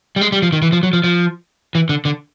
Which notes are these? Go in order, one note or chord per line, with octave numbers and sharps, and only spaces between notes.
G3
G#3
G3
F3
D#3
E3
F3
F#3
F3
F3
E3
D3
D3